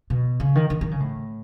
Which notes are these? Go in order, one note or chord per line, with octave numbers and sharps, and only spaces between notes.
B2
C#3
D#3
D#3
D#3
C#3
A2